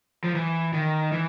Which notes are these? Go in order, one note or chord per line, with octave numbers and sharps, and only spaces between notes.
F3
E3
D#3
E3